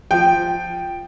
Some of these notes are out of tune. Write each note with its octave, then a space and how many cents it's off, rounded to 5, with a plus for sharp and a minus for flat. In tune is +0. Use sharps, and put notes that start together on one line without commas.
F3 +0 G5 +0